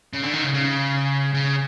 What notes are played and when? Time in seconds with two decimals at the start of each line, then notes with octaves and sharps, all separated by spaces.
0.13 C#3
0.23 D3
0.33 D#3
0.44 C#3
0.54 C#3
1.35 C#3